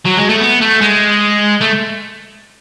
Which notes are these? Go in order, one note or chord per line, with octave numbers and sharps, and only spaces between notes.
F#3
G#3
A3
B3
A3
G#3
A3